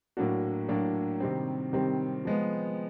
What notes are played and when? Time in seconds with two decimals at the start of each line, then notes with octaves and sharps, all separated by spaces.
0.17 A2 F#3 A#3 D4 F#4
0.69 A2 F#3 A#3 D4 F#4
1.20 C3 D#3 G3 C4
1.73 C3 D#3 G3 C4
2.25 F3 G#3 B3